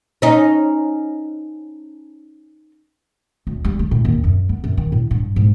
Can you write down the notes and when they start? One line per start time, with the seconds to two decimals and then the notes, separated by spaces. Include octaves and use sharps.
0.22 C#4 D#4
3.47 D2
3.64 G3
3.79 A3
3.91 A2
4.05 D#2
4.24 F#2
4.49 B3
4.64 F#2
4.77 D#3
4.92 A2
5.11 G2
5.36 G#2